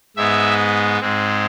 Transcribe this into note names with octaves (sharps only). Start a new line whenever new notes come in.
G#2 G#3 B3 E5
G#2 G#3 C4